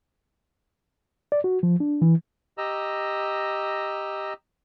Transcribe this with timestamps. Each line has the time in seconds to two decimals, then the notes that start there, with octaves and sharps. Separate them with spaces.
1.32 D5
1.44 F#4
1.63 F3
1.80 D4
2.02 E3
2.58 G4 D#5 A#5 E6